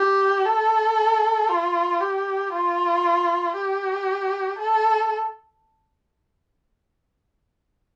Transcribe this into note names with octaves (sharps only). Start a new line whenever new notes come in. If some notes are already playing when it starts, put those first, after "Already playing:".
Already playing: G4
A4
F4
G4
F4
G4
A4